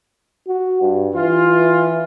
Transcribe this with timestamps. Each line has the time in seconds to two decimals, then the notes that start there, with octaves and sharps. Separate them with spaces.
0.47 F#4
0.81 G2
1.14 E3 F4